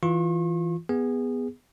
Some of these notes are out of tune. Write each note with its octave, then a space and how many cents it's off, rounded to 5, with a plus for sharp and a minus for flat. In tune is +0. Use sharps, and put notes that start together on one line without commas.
E3 +0 F4 +0 C#6 -45
B3 +0 G#4 -20